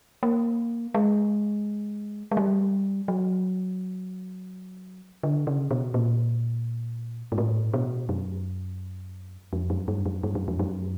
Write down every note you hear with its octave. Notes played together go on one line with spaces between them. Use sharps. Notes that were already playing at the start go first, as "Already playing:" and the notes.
A#3
G#3
G#3
G3
F#3
D3
C#3
B2
A#2
G#2
A2
B2
F#2
F2
F#2
G2
F#2
G2
F#2
F2
F#2